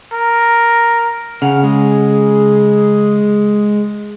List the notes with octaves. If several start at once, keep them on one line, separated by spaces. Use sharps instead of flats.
A#4
C#3 F#5 F6
G#3 G#4